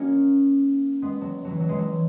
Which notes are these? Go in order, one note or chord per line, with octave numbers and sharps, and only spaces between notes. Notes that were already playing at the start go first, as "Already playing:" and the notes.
Already playing: A#3 C#4 D#4 F#4
G#3 B3
F#3
F#3
E3
F#3
E3 G#3
F#3